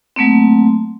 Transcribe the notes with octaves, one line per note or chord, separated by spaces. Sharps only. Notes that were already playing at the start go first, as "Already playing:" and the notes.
F#3 A3 A#3 C4